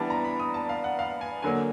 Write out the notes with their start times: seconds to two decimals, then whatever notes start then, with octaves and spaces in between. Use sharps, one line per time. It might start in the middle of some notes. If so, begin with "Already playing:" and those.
Already playing: E3 G3 B3 D4 A5
0.10 A#5
0.24 B5
0.40 D#6
0.54 A5
0.69 F5
0.84 F#5
0.99 F5
1.21 G#5
1.42 D3 F#3 A#3 G#5